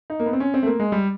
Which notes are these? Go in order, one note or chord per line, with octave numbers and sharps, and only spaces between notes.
D#4
A#3
B3
C4
C#4
C4
A3
A#3
G#3
G3